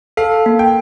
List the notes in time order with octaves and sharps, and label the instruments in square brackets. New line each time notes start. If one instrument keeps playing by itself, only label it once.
[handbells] A4 [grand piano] F5
[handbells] A#3
[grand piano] G5